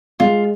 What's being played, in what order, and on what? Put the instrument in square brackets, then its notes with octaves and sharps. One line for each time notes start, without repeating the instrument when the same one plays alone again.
[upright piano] G#3 [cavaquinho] F4